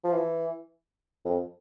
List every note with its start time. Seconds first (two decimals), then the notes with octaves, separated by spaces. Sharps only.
0.04 F3
0.13 E3
1.25 F2